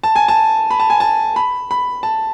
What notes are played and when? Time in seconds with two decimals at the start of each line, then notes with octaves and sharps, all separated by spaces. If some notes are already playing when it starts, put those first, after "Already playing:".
0.04 A5
0.16 G#5
0.28 A5
0.71 B5
0.80 A5
0.90 G#5
1.00 A5
1.36 B5
1.71 B5
2.03 A5